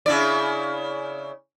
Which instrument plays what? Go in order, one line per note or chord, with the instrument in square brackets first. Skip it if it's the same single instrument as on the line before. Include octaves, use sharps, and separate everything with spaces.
[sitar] C#3 E4 D5